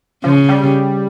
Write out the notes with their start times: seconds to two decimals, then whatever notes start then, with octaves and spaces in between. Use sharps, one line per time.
0.24 C#3 F3
0.49 G3